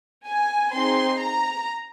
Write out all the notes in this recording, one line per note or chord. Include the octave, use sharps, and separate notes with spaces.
G#5
C4 D#4 G#4 C6
A#5